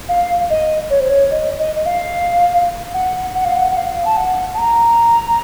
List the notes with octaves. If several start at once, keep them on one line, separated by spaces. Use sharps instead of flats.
F5
D#5
C#5
C5
C#5
D#5
D#5
D#5
F5
F#5
F#5
F5
F#5
F#5
F5
A5
F#5
A5
A#5